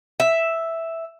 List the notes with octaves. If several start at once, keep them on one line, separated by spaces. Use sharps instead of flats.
E5